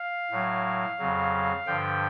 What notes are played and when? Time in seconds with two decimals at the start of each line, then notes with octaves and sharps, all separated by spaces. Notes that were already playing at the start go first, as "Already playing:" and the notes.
Already playing: F5
0.31 A2 F#3
0.99 F2 C#3 F#3
1.66 G2 D3 F3 G5